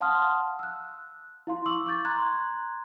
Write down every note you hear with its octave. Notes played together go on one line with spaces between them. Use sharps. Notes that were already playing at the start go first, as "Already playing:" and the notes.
F5 F#5 A5 C6 D#6 F6
E6 F#6
E4 F5 C6
C#6 D6 E6 F#7
C#6 D6 G6 A6
A#5 C6 F#6 G#6